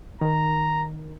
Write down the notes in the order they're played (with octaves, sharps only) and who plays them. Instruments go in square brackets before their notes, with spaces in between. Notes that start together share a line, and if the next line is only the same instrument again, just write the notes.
[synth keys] D#3 A#4 [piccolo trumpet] A#5